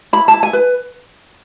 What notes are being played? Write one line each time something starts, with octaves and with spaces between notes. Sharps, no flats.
E4 B5
A5
E4
G#5
B4